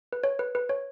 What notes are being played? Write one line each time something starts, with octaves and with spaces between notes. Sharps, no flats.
B4
C#5
B4
B4
C#5